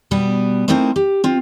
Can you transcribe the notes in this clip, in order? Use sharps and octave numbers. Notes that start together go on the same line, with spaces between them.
B2 G3 B3
A3 C4 D#4 E4 A#4 C5
G4
C4 F4